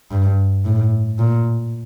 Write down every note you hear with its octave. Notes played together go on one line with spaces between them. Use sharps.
G2
A2
A#2